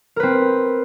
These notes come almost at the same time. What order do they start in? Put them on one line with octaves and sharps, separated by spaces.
A#4 B4 C4